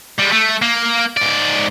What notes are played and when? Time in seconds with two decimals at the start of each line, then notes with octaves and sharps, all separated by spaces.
0.19 G3 G#3
0.32 A3
0.62 A#3
1.17 G#2 D5